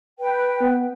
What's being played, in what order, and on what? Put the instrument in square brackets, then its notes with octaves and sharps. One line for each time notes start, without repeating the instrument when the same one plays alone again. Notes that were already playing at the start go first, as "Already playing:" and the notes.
[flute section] B4 G5
[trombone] B3